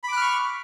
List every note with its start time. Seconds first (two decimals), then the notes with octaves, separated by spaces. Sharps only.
0.04 B5
0.08 D6
0.12 F#6
0.17 F6
0.21 C#6